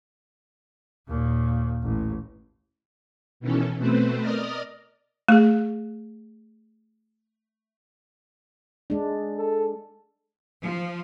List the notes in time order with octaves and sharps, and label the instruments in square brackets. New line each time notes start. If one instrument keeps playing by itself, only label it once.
[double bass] D#2 A#2
A1
[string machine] B2 D#3 E3 C#4 A4
B2 A3 C4 B4 C5
A#4 D5 D#5 D#6 F6
[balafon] A3 G#4
[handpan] G#3 D4
[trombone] A4
[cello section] F3